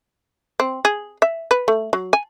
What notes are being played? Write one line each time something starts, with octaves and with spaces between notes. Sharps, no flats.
C4
G#4
E5
B4
A3
F#3
G#5